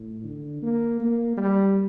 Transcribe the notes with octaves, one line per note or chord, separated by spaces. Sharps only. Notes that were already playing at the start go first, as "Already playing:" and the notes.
Already playing: A2
D3
A#3
A#3
G3